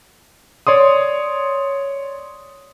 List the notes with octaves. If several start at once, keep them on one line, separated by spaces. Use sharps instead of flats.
C#5 D5 C6 D#6